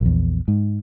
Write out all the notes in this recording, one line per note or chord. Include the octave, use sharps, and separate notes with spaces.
A#1 E2
G#2